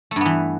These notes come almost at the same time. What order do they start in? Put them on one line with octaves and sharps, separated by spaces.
A3 G2 B3 E3